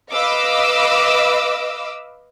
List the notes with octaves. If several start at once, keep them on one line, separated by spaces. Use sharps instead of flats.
B4 D#5 F5 D6 E6